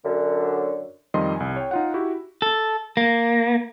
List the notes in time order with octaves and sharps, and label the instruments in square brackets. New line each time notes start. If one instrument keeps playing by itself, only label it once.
[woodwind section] F#2 D3
[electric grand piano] F2 D#3 F3 G3 D#5 C6
C2 G#5
C#5 G5
D#4 F4 F#5
E4 F#4 G4
[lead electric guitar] A4
A#3